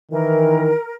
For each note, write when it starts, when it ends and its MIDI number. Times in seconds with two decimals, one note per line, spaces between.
0.11 0.70 51
0.11 0.70 52
0.11 0.93 70